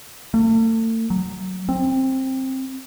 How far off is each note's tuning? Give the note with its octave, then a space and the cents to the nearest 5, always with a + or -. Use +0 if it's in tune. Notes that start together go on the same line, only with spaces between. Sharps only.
A3 +40
F#3 +5
C4 +15